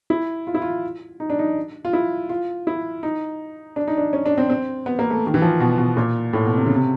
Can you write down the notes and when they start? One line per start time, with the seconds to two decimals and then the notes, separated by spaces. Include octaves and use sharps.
0.10 E4
0.47 F4
0.55 E4
0.62 F4
1.20 D#4
1.30 D4
1.39 D#4
1.85 F4
1.93 E4
2.29 F4
2.67 E4
3.03 D#4
3.76 D4
3.87 D#4
3.97 D4
4.13 C#4
4.26 D4
4.38 C4
4.50 C4
4.86 B3
4.99 A#3
5.10 A3
5.27 D#3
5.34 E3
5.42 F3
5.60 B2
5.78 B2
5.97 A#2
6.33 A2
6.45 B2
6.58 C3
6.66 C#3
6.75 C3